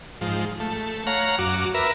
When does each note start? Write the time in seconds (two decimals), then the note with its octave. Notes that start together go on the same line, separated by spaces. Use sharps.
0.21 G#2 F3
0.60 A3
1.07 C#5 F5 F#5 A#5
1.39 F#2 F#4 D6
1.74 A#4 B4 E5